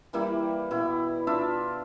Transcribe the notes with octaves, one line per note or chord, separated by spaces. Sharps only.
E3 G3 A#3 E4
B2 E4
D4 F4 E5